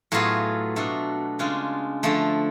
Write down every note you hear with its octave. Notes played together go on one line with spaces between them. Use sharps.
A2 F#3 B3 F4 G#4
B2 A3 D4
C#3 G#3 D4 F4
D3 F3 A3